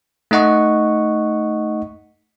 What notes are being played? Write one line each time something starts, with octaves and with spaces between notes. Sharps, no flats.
A3 D#4 D#5 F#5 C#6